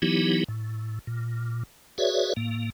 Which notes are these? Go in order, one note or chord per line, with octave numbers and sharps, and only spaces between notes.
E3 F#3 B3 D#4 E4 G4
A2
A#2
F#4 G#4 B4 C#5 D5 E5
A2 A#3